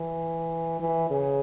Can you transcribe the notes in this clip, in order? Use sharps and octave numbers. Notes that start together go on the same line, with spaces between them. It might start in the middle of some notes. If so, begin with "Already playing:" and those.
Already playing: E3
E3
C#3